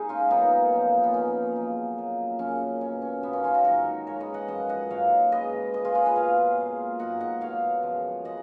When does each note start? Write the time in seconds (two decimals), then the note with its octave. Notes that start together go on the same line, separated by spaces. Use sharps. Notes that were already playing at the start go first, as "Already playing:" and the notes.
Already playing: G#3 A#3 D#4 G#4 A#4
0.09 C#4 F4
0.30 F#2 C#3 F#3 A#3 B3 D#4
0.73 F#2 F3 A#3
1.04 B3
1.14 A#2 F3 A#3 C#4
1.56 C#3 F#3 A#3
1.98 A#2 F#3 A#3
2.39 F#2 C#3 F#3 A#3 C#4
2.81 B2 A#3 C#4
3.02 C#4
3.22 F#2 D#3 A#3 B3
3.33 C#4
3.44 C#4 F4
3.54 D#4 F#4
3.64 G#2 D#3 F#3 F#4 A#4
4.07 C#3 G#3 A#4 C#5
4.20 B4 D#5
4.34 D#5 F#5
4.48 F#2 F3 G#3 D#5 F#5
4.69 D#5 F#5
4.90 G#2 F#3 A#3 C#5 F5
5.32 C#3 G#3 B4 D#5
5.74 A#2 G#3 B4 D#5
5.85 F4 G#4
5.95 F4 G#4
6.06 B4 D#5
6.15 B2 A#3 C#5 F5
6.58 A#2 G#3
6.99 G#2 F#3 A#3 D#5 F#5
7.20 D#5 F#5
7.41 B2 A#3 C#5 F5
7.83 F#2 F3 G#3
8.25 C#3 G#3 D#5 F#5